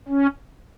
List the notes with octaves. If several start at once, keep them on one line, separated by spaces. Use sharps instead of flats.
C#4